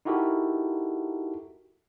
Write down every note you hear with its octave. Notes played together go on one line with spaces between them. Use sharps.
D#4 E4 F#4 G4 A4 A#4